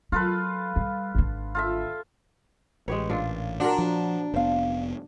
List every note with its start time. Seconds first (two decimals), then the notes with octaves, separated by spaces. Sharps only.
0.12 F#3 F4 A4 B4
0.76 G3
1.15 G#1 D3
1.55 F4 A4 E5
2.88 A1 G#3 G4 B4 C#5
3.10 A#2 D4 F4
3.60 F#3 D4 F4 A#4 D5 F#5
3.79 F3
4.33 F1 B3 C5 F5